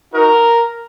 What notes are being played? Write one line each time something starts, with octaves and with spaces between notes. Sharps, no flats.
D#4 F#4 A#4